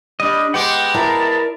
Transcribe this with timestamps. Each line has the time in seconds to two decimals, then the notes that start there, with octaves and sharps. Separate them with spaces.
0.20 G3 D4 D#5
0.54 G#3 B3 F#5 G5 D6
0.94 E4 A#4 D5 E5 A5 A#5